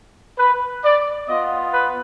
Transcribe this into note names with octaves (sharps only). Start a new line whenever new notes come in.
B4
D5
B3 F4 D#5
B4